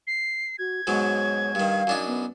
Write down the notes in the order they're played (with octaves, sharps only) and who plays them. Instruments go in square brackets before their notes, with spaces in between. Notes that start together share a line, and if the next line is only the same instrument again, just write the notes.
[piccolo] C7
[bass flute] F#4 [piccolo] G#6
[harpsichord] G#2 B2 F#3 [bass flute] C#5
[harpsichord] G2 D#3 [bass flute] F5
[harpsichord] F#2 D4 D#4
[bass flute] B3